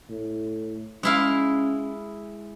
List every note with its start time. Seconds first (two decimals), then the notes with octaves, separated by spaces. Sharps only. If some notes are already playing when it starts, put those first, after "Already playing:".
0.10 A2
1.03 G#3 C#4 E4 F5